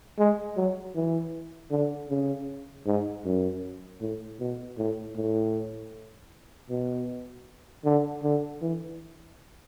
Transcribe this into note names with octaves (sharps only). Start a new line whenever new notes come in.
G#3
F#3
E3
D3
C#3
G#2
F#2
A2
B2
A2
A2
B2
D3
D3
E3